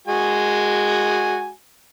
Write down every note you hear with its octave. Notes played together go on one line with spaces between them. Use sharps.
G#3 F#4 G#5